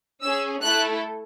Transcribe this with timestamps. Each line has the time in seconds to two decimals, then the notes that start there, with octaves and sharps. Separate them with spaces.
0.22 C#4 G#4 E6
0.62 A3 E4 A4 F#6